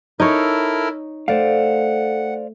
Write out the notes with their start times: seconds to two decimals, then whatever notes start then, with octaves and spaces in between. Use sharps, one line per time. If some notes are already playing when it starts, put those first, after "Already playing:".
0.20 D#4 E4 A4 A#4 C#5
1.28 A3 C5 D5 F5 F#5